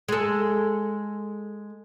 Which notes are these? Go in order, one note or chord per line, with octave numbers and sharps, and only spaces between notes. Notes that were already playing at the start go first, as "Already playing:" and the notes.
G#3 A4